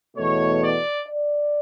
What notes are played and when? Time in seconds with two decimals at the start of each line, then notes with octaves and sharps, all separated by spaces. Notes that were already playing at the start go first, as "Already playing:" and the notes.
0.17 E2 B2 A3 C#5
0.63 D5
1.08 D5